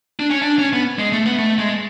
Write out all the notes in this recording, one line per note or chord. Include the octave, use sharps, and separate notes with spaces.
D4
C#4
D4
C#4
B3
G#3
A3
B3
A3
G#3